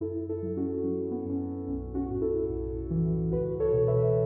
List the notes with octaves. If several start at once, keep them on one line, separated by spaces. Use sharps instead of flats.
F#2 E4 A4
E4 A4
F#3
C#4 F#4
F#3 C#4
B3
F#2 C#4
B3
B1 C#4
C#4 F#4
A2
E4 A4
B1
E3
C#2 F#4 B4
A4 C#5
B2
B4 E5